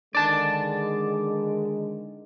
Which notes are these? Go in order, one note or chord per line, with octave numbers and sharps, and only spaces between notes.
D3 D#3 G#3 D5 A5